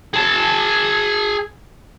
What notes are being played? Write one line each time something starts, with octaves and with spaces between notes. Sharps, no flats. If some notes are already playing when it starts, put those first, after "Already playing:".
G#4 A5